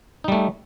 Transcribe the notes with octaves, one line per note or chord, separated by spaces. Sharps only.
G3 A3 D#4